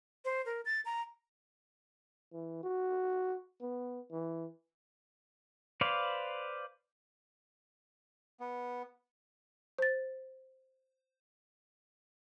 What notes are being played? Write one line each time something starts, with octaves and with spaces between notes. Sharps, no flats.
C5
A#4
A6
A#5
E3
F#4
B3
E3
B4 C5 D5 F5
B3
C5 A6